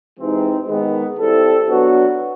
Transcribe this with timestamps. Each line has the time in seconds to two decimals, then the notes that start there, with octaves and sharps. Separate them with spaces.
0.18 C3 E3 G#3 C4 D#4
0.68 D#3 G#3 B3
1.18 G3 C4 E4 A4
1.67 F#3 B3 D4 F#4